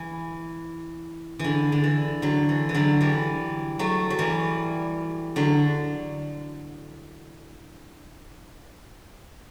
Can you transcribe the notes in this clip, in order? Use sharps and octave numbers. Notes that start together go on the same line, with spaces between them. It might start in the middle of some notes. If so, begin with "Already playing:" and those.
Already playing: E3
D3 E3
D3
E3
D3 F#3
E3
E3
D3 F#3
E3 G3
F#3 A3
F#3
E3 G3
D3 F#3